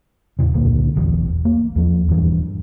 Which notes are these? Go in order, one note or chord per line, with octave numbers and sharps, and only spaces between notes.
E2 A2 C#3
C#2 A#2 D3 A#3
F1 B1 E2
A#3
E2 F3
D#1 G2 E3